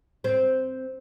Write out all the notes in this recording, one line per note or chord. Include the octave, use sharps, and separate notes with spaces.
C4